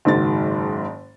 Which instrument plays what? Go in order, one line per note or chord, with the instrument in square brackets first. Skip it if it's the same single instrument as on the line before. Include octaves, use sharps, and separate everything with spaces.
[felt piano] F#1 G#2 D#3 F#3 A6